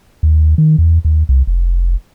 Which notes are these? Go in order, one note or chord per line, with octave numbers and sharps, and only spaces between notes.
D#2
D#3
E2
D#2
C2
F1